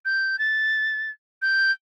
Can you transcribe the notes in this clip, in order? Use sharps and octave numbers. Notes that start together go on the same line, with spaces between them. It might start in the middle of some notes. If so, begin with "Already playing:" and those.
G6
A6
G6